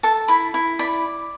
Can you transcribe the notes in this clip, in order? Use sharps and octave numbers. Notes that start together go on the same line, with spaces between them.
A4 A5
E4 B5
E4
D5 B5